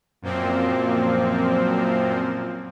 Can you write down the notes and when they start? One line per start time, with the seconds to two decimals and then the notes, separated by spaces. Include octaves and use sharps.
0.22 F#2 A#2 F3 A#3 C4